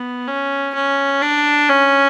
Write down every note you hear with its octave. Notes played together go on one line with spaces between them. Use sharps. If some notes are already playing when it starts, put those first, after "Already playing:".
Already playing: B3
C#4
C#4
D4
C#4